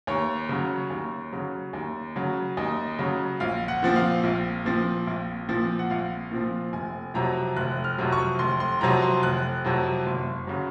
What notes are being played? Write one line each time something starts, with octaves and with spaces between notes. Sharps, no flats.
D#2 C#5
C#3 F#3
D#2
C#3 F#3
D#2
C#3 F#3
D#2 D#5
C#3 F#3
A#1 F5
F#5
A#2 F3 C4
F5
A#1
A#2 F3 C4
A#1
A#2 F3 C4
F#5
A#1 F5
A#2 F3 C4
F1 G#5
F2 C3 F#3 A#5
F1 F#6
F6
F2 C3 F#3
C#6
F1 C6
C6
F2 C3 F#3 A#5
C6
F1 F#6
F2 C3 F#3
F#1
C#3 F#3